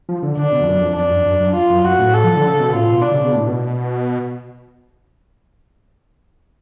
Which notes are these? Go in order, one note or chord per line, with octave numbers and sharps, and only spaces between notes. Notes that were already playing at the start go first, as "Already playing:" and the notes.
F3
D3
D3 D4
B2
F2
F#2
F2
F2 D4
F#2
F#2
F#2
F4
F#2
F#2 F#4
A2
A4
F3
D3
C#3
B2
A2 F4
B2
D4
C#3
B2
A2
B2